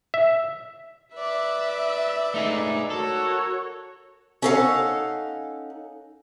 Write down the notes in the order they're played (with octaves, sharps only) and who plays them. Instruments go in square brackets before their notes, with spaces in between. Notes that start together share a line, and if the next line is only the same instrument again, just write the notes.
[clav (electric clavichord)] E5
[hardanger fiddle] B4 D5 [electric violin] E5
[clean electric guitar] A3 D#4 G#4
[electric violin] F#4 C#5 [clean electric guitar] A4 [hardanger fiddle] A#4
[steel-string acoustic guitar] C#4 D#4 A4 B4 F5 F#5